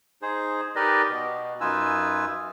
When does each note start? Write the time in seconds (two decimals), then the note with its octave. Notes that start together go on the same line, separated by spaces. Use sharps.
0.22 D#4 G#4 C5
0.76 D#4 G4 A#4 B4 D5 D#5
1.10 B2
1.61 F#2 D#4 F4 B4 G#5 E6